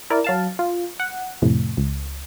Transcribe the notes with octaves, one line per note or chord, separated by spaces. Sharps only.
E4 A#4 D5
F#3 F5 A5
F4
F#5
F2 A2 C3
C#2